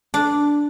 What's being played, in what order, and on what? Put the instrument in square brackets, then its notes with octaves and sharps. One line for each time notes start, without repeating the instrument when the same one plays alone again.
[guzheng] D4